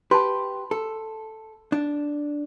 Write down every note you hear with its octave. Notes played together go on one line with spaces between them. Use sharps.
G4 B4 A5 C6
A4
D4